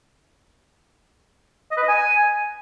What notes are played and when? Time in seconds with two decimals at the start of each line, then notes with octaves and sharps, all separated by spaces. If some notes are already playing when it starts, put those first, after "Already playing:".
1.71 D#5
1.77 B4
1.83 D#5
1.88 G#5